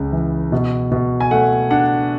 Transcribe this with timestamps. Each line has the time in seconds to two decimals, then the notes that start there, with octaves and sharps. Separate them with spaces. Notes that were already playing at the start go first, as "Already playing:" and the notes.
Already playing: C#2 C#3
0.12 E3
0.52 B2
0.92 B2
1.21 G#5
1.31 A3 F#5
1.70 D4 F#5